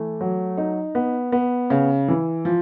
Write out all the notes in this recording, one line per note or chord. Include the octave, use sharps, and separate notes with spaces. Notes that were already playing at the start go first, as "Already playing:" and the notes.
Already playing: E3 A3
F#3
D#4
B3
B3
C#3
E3
F3